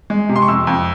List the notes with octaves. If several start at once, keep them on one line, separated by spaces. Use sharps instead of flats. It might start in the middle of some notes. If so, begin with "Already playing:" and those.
G#3
C3
C6
C#6
F2 E6
F2